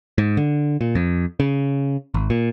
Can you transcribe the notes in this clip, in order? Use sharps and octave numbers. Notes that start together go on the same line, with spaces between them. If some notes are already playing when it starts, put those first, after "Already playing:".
G#2
D3
A#2
F2
C#3
G#1
A#2